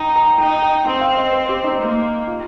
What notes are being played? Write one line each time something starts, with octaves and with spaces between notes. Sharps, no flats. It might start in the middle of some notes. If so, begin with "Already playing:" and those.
Already playing: D#4 G5 A#5
A#5
G5
D#4 G5
G5
C4 G5
F5
D#5
C5
G4
D#4
A#3
F4